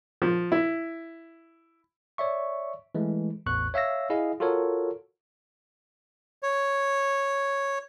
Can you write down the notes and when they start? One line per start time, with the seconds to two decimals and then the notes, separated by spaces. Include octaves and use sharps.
0.22 F3
0.52 E4
2.18 C#5 D5 E5 C#6
2.95 E3 G#3 A3
3.46 A1 E2 C#6 F#6
3.74 C#5 E5 F5 E6 A#6
4.10 E4 G#4 D#5 F5
4.40 F4 F#4 A4 A#4 C#5
6.43 C#5